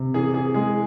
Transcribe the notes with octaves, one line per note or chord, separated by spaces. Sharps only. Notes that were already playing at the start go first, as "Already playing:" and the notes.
Already playing: C3
E3 G#4
G#4
G#3 G#4